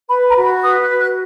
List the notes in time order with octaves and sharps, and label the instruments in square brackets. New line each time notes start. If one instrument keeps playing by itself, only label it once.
[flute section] B4 B5
A#5
F#4
B5
B4 D#6
F#6
F#4
F#6